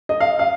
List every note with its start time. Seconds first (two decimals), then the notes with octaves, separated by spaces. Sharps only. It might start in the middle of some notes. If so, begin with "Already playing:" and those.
0.09 D#5
0.20 F5
0.39 F5